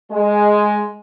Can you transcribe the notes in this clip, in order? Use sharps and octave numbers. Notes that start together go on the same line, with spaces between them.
G#3